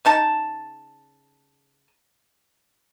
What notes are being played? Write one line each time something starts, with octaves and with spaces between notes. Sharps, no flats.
C#3 D#4 A5